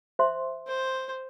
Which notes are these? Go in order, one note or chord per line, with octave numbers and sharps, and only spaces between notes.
C5 E5 C6
C5